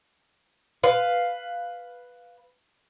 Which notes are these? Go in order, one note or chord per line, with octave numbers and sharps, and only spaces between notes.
B4 F5